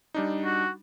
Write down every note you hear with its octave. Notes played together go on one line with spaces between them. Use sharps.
G3 D4 D#4
F#4